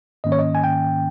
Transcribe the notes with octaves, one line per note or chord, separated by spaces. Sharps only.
G#2 D#3 A#3 C#4 D#5
C#5
D#5
G#5
G5